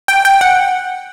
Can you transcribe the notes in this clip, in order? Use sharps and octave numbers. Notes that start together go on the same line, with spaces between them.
G5
G5
F#5